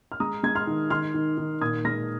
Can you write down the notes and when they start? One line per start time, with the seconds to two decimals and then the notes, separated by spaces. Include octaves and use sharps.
0.12 F6
0.20 G#3 A#5 D#6
0.43 G#3 G#6
0.55 C6 F6
0.67 D#3
0.90 D#3 C6 F6
1.14 D#3
1.38 D#3
1.61 A#2 D#6 G#6
1.85 G#3 F6 A#6